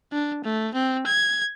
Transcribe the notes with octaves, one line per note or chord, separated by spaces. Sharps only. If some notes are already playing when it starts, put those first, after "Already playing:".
D4
A3
C4
G#6